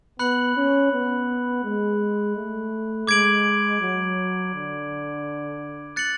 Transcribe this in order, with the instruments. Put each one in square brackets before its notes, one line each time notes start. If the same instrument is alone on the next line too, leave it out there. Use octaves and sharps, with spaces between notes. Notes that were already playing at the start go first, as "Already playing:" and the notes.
[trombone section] B3 [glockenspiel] B5 F#6 C#7 F#7
[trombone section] C#4
B3
G#3
A3
[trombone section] G#3 [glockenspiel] D6 G#6 D7 F#7
[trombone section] F#3
D3
[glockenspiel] F#6 A6 C#7 F#7